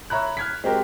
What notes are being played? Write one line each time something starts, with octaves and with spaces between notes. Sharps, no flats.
C#5 E5 A#5 B5 F#6
F6 G#6 B6
G#3 C4 F#4 G4 A#4